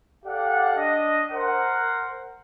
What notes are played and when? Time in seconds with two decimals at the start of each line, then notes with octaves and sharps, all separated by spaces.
0.25 G4 A4 D5 F5 F#5
0.76 D4 D#5
1.32 A#4 C5 F#5